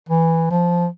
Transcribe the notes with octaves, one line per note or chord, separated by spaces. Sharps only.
E3
F3